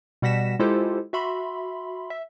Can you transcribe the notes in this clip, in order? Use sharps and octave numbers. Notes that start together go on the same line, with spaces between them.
B2 G3 F#5 A#6 B6 E7
G#3 E4 F4 G4 A4 C5
F#4 E5 B5 C6
E5